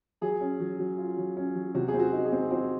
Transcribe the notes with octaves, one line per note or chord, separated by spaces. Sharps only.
F#3 G#4
C#4
F#3
F#3
F4
F#3
C#4
F#3
C3 F#4
G#4
C4
F#4
D#4
G#4
C4
C4 F#4